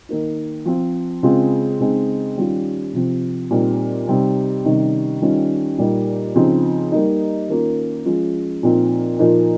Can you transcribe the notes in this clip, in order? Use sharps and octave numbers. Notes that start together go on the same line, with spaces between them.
D#3 A#3 D#4
F3 C4 F4
C#3 G#3 C4 F4
C#3 G#3 C4 D#4
D#3 G3 C#4 F4
C3 F3 C4
A#2 G3 C4 D#4
C3 G3 C4 D#4
C3 D#3 G3 C#4
D#3 G3 C#4 F4
A#2 G3 A#3 D#4
C#3 F3 C4 D#4
G3 A#3 D#4
D#3 A#3 C#4 F4
F3 G#3 C#4 F4
A#2 F3 C4 D#4
A#2 F3 A#3 D#4